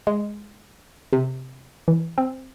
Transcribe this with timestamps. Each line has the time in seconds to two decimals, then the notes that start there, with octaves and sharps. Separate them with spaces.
0.07 G#3
1.13 C3
1.88 E3
2.18 C4